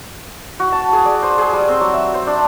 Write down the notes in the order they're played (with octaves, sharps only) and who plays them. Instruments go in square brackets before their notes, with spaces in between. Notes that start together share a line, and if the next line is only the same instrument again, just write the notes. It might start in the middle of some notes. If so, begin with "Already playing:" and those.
[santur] F#4
A5
G#4
D5
C5
G#4
G3
C4
F#3
E5
C5
D4